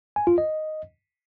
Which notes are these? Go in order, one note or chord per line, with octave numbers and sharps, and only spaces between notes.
G#5
F4
D#5